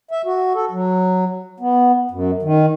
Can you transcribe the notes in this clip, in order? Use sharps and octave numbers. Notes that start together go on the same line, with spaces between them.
E5
F#4
A4
F#3
B3
F#2
D#3